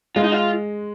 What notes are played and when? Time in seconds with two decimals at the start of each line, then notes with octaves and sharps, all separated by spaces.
0.16 G#3 F4
0.23 D#4
0.32 F4